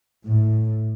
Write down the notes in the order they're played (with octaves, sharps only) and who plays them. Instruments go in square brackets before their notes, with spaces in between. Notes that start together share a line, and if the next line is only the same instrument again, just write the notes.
[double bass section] A2